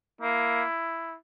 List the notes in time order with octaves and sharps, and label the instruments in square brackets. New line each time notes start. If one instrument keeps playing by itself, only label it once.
[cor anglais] A#3 [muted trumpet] E4